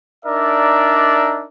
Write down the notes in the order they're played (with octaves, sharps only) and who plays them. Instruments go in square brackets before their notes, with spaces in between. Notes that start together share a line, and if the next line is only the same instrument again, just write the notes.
[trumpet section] D4 D#4 A#4 D5 E5